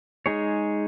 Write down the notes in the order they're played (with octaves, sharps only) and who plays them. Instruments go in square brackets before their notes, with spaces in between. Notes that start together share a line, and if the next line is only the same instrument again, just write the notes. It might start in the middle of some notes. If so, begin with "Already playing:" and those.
[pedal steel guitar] G#3 D#4 G#4 C#5